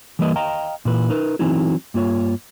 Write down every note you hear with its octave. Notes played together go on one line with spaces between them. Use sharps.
E3 G3 A#3 B4 D#5
D#5 F5 G5 A#5
A#2 E3 B4
D#4 A#4 B4
E3 F#3 C4 D#4 E4
G2 A#3 F4 C#5